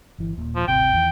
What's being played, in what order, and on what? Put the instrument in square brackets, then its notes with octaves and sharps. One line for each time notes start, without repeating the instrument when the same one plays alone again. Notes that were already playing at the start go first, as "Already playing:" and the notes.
[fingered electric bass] G1 E3
D#1 A#2
[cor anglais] F3
[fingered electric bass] D1 G#1 C3 [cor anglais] G5
[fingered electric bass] E2 D#3